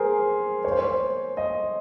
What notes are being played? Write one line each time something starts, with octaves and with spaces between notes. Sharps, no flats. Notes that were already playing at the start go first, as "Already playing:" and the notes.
Already playing: G#4 A#4 C5
C#5
C5
C#5
D#5